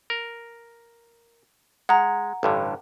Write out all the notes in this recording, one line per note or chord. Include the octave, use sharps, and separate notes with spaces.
A#4
G#3 F#5 A#5
A1 G2 D3